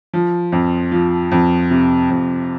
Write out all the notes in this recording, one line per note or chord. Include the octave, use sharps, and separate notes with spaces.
F3
F2
F3
F2
C3
F2